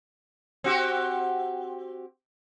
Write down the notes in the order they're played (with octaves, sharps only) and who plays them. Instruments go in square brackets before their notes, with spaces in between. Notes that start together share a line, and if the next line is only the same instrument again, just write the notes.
[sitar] C4 F#4 G4